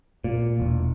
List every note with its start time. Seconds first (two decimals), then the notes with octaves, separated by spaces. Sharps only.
0.24 A#2
0.60 E1